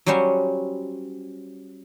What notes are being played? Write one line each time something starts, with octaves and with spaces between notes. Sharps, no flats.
F#3 G3 C#4 C5 C#5